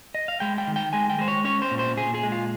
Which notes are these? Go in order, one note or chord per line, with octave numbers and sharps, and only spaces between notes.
D#5
F5
G#3 G5
G5
D#3
G5
G#3 G#5
G5
G#3 C5
C#5
C#4 C#5
C5
A#2
C5
A#2 G#4
G#4
G#3
F4